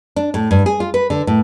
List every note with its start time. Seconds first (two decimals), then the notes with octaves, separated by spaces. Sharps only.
0.16 D4
0.34 A2
0.51 G2
0.66 G#4
0.80 F4
0.94 B4
1.10 D3
1.27 A2